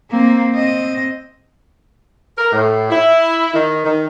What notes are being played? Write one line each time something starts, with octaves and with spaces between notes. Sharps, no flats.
A#3 C4
C4 D#5
A#4
A2
E4
D#3
D#3